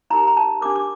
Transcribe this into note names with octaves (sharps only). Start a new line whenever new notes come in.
D#4 G4 A#4 A#5
A#5
A5
D4 G4 A#4 D6
D6